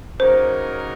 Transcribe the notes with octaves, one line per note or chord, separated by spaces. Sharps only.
C#3 F#3 A#3 D#4 A#4 C5